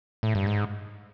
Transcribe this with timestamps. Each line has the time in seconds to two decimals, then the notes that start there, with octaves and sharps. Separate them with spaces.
0.23 A2
0.35 G2
0.47 G#2